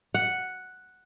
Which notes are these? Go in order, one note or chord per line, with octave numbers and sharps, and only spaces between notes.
F#5